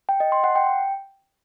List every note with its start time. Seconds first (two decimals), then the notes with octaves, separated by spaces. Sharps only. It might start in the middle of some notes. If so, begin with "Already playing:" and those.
0.09 G5
0.20 D#5
0.32 C6
0.44 F#5
0.55 G5